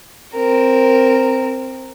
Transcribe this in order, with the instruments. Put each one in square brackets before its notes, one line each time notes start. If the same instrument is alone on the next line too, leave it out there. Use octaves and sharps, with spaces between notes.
[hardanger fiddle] C4 A#4